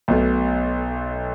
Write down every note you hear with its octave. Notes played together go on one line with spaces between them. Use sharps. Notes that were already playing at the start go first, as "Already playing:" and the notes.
B1 B2 A3